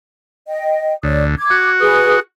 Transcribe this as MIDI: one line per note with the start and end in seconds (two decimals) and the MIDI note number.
0.47 0.93 75
0.47 0.93 79
1.03 1.36 38
1.03 1.24 73
1.03 1.24 74
1.03 1.24 87
1.37 1.69 86
1.37 1.69 92
1.50 2.20 66
1.80 2.18 68
1.80 2.18 71
1.80 2.18 87